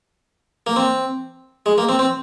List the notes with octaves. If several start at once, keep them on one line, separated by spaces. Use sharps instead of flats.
A#3
C4
G#3
A#3
C4
C4